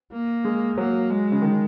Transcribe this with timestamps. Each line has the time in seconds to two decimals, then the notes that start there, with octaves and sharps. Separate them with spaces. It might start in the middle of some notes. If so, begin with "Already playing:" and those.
0.12 A#3
0.45 G#3
0.77 F#3 A#3
1.10 G#3
1.32 C#3
1.42 D#3